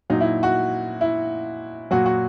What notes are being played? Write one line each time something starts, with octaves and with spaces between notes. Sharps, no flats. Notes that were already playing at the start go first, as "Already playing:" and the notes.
A#2 F#3 D#4
E4
F#4
E4
A#2 F#3 F#4
F#4